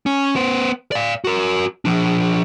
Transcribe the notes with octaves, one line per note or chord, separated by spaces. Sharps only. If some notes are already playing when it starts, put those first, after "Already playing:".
C#4
B3 C5
D5 F5
F#4 A#4
F3 D4